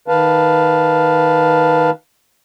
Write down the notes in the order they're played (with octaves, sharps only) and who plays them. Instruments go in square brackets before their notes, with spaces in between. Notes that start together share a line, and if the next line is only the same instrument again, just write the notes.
[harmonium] D#3 B4 F5 A5